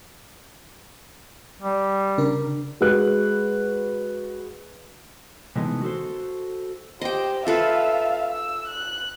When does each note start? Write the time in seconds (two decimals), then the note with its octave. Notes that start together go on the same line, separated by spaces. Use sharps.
1.62 G3
2.18 C#3 D4 A#4
2.81 G#3 F#4 B4 F#6
5.56 C3 D#3 E3 G#3 A3 B3
5.82 F#4 A4 C5
7.01 G4 C5 D#5 G5
7.47 F4 A4 B4 E5 F5
8.33 E6
8.68 F#6